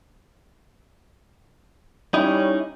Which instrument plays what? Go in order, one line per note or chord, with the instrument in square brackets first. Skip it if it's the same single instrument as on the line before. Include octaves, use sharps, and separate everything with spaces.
[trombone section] G3 C#4 [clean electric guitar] D#4 E4